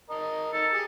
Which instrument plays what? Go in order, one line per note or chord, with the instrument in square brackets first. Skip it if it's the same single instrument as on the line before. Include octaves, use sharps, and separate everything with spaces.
[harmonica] A#4 D#5 A5
[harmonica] D#4 A#4 A5 [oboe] A4
[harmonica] G4 G#4